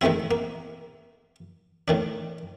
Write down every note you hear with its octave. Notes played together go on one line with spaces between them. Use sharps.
D#3 G#3 A3 C4 E4
A#3
A2 D#3 D4